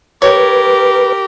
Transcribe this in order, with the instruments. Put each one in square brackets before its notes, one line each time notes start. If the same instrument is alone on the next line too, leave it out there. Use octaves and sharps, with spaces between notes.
[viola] G4 A#4 [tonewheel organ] B4 [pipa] C#5